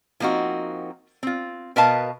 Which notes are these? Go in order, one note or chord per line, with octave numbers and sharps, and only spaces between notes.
F3 A#3 C4 D#4 F#4
C4 F4
B2 A#4 B4 D#5 F5 A5